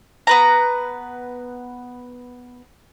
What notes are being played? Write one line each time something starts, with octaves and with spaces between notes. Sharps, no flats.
B3 B4 A#5